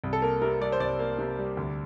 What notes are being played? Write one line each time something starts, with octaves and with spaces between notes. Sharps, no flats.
C2
A4
A#3 A#4
C3 A#4
G3 D5
C5
C2 D5
A#3
C3
G3
D2